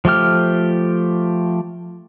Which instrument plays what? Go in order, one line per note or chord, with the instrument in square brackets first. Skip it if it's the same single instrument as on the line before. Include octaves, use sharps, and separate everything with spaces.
[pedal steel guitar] F3 A3 G4 F6